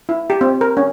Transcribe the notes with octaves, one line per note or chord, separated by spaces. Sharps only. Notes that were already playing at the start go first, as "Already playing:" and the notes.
E4
G4
C4
A#4
C#4